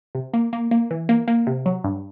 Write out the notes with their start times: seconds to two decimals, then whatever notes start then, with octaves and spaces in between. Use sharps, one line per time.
0.15 C3
0.34 A#3
0.53 A#3
0.71 A#3
0.91 E3
1.09 A#3
1.28 A#3
1.47 C3
1.66 F#3
1.84 G2